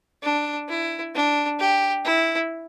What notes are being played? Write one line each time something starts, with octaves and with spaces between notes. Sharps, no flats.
D4
E4
D4
G4
E4